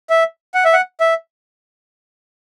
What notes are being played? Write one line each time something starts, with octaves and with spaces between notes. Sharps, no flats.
E5
F#5
E5
F#5
E5